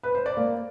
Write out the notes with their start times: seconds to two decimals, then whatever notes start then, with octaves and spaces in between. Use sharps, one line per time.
0.03 B4
0.15 C5
0.26 D5
0.37 A#3